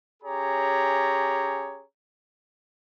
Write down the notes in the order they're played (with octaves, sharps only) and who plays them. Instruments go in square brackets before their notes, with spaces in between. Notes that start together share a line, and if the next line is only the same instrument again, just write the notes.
[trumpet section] C#4 G4 G#4 C#5 A#5